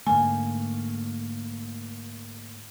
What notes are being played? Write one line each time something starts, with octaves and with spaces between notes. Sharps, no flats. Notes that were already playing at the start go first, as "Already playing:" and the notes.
G#2 D3 A3 A#3 G#5